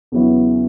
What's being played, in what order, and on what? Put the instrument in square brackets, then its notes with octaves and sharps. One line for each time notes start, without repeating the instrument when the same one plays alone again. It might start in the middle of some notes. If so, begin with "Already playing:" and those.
[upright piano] E2 C#3 F#3 B3 E4